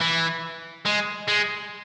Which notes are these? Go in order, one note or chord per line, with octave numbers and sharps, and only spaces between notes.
E3
G#3
G#3